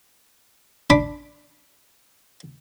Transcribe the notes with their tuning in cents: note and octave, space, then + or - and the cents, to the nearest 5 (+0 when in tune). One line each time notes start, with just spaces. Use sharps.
D4 +0 B5 +0